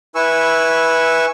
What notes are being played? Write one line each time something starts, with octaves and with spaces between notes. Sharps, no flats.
E4 B4 G#5 C#6 E6